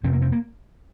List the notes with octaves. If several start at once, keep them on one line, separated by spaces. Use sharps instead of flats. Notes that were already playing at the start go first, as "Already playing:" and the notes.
F2 C3 C4
A#3
C4
A#3